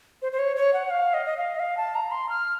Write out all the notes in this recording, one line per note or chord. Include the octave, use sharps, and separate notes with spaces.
C5
C5
C#5
C#5
F#5
F5
D#5
D#5
F5
D#5
F5
A5
A#5
C6
F6